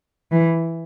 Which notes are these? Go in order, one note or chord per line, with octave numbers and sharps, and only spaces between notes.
E3